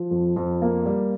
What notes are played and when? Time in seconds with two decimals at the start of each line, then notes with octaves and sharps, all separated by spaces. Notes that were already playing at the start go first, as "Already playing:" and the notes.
Already playing: F3
0.11 F2
0.36 F2
0.62 A#3
0.86 G3